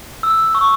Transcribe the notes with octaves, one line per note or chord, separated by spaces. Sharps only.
E6
C#6